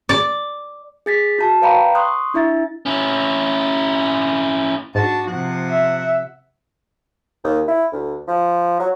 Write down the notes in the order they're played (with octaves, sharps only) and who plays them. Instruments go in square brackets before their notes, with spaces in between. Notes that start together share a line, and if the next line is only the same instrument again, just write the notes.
[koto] D5
[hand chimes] G#4 A6 B6
F#4 A5
B4 D5 F5 G5 A#5 B5
C6 C#6 D#6 F#6
D4 E4 E5 A6
[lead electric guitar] C#4 E4
[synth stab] G#2 [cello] D4 F#4 [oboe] A5
[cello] C3 F3 [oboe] F#5
[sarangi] E5
[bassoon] D#2
E4
D2
F3
F#3